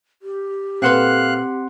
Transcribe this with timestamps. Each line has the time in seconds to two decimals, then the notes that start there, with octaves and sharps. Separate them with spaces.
0.22 G4
0.82 A#2 C4 A4 B4 F5 F#5 C6 F#6